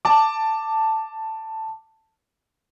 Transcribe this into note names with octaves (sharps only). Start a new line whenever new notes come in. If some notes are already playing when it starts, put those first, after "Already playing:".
A5 D6